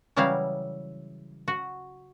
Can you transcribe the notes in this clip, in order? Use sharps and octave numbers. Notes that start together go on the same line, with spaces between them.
C#3 E3 F#3 G3 E4 F5
F#4